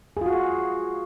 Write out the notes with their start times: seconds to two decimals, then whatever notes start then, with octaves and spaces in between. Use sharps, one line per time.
0.17 G#4
0.21 F4
0.26 F#4